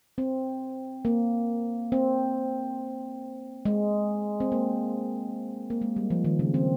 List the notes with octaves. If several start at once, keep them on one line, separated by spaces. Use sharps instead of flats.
C4
A#3
C4
G#3
C4
A#3
A#3
G#3
G3
F3
D#3
C#3
C4